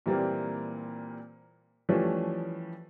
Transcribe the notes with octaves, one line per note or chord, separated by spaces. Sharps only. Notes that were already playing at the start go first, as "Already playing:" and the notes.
A#2 E3 G3 A#3 C4
E3 F3 G3 A3 C#4